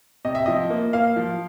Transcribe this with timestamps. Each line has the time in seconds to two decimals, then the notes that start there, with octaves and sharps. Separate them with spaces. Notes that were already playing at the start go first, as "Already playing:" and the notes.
0.25 C3 D#5
0.35 E5
0.46 F3 D#5
0.70 A#3
0.93 A#3 F5
1.16 F3